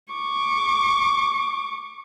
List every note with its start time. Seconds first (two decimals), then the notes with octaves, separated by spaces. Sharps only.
0.13 C#6 D6